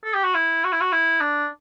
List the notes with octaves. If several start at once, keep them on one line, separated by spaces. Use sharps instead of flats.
A4
G4
F#4
E4
F#4
E4
F#4
E4
D4